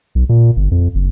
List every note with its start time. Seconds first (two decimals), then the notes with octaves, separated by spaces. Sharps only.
0.15 B1
0.29 A#2
0.56 G1
0.71 F2
0.95 F#1